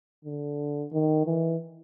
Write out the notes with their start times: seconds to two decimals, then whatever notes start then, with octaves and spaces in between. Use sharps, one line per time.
0.25 D3
0.93 D#3
1.26 E3